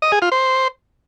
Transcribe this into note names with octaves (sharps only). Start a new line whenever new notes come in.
D#5
G#4
F4
C5